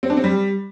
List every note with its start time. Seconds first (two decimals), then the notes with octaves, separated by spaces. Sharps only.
0.03 C4
0.10 D4
0.17 C4
0.24 G3